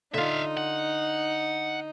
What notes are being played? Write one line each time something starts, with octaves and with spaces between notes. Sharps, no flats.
D3 D#4 F4 E5 F5
F#5